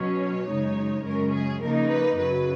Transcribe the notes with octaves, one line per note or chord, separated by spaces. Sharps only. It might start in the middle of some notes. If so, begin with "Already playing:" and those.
Already playing: B2 F#3 C#4
C#5
F#2 C#3 G#3 D#4
F#2 C#3 G#3 C#4 A#4
G#4
C#3 F3 A#3 D#4 A#4
B4
F#2 C#3 F#3 B4